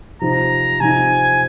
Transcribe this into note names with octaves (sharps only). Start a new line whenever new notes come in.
C3 F3 C4 D#4 A#5
C3 F3 C4 D#4 G#5